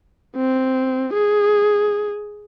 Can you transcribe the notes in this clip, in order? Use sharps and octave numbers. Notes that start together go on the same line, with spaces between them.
C4
G#4